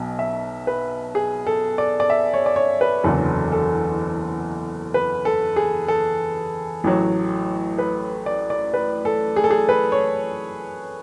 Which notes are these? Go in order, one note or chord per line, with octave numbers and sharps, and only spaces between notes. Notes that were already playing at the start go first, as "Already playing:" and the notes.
Already playing: B1 B2 F#3
E5
B4
G#4
A4
D5
D5
E5
C#5
D5
C#5
B4
F#1 E2 D3 F#3 A4
A4
B4
A4
G#4
A4
A1 A2 F#3
B4
D5
D5
B4
A4
G#4
A4
G#4
B4
C#5